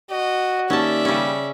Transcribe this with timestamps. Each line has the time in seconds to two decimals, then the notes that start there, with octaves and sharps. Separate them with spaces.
0.11 F#4 D#5
0.70 D#2 C#4 D5 E5 A5
1.05 C#3 G3 C#4